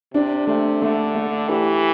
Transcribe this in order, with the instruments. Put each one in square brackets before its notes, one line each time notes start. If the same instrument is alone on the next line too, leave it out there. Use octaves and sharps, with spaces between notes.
[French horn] C3 [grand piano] D4
[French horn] C3 [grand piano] A3
[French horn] D3 [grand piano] A3
[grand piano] A3
[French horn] E3 [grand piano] G4